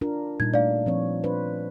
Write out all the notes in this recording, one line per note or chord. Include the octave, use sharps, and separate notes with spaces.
D4 F4 A#4
A#2 G3 D#4 G#6
A3 D4 D5 F5
F3 C4 C#5
D4 B4 C5